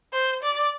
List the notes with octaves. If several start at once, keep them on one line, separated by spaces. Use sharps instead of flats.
C5
D5